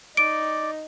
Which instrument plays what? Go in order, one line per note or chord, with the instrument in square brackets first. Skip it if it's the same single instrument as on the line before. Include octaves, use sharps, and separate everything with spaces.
[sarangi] D#4 [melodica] D5 [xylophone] D7